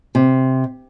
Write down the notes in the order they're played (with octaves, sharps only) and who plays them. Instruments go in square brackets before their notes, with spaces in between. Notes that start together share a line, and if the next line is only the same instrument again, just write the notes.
[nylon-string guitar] C3